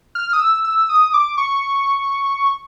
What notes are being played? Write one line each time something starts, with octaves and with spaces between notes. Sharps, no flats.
F6
D#6
E6
E6
D#6
D6
C#6